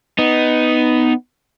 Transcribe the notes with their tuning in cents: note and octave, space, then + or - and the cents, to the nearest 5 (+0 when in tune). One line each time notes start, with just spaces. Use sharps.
B3 +10 D#4 +0